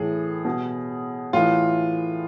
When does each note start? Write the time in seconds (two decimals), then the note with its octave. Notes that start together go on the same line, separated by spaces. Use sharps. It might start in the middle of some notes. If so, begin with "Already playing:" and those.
Already playing: A2 E3 G#4
0.45 B2
1.33 A2 E3 F4